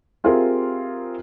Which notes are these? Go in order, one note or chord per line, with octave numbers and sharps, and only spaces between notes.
C4 F4 G4 G#4 A#4 E5